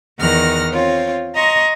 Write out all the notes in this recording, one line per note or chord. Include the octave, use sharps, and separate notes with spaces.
E2 D#3 F#5 F6 A#6
C4 F4 C#5
D#5 A#5 C6 C#6